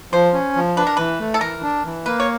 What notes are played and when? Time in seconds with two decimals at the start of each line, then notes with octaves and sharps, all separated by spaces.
0.13 F3 C5
0.33 C#4
0.56 F3
0.77 D4 B4
0.87 A#4
0.97 E3 B4
1.20 A3
1.34 A4
1.41 E3 A#4
1.62 D4
1.85 E3
2.06 A#3 B4
2.20 C#5